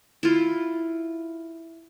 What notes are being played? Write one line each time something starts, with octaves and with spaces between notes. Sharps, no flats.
E4 F4